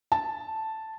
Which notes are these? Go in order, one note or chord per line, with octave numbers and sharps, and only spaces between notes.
A5